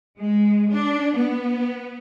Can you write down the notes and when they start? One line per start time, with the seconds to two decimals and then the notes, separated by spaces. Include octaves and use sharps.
0.20 G#3
0.68 D4
1.16 B3